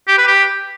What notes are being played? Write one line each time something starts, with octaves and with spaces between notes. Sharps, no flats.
G4
B4
G4